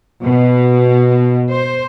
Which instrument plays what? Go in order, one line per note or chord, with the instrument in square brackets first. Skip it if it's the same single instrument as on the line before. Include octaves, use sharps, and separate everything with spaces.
[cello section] B2
C5